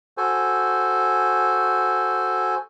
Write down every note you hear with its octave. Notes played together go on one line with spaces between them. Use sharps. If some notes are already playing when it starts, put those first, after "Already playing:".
F#4 A4 C5 G#5